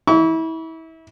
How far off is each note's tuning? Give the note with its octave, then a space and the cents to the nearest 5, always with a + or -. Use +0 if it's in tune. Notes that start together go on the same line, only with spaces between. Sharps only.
E4 -30 C#6 +40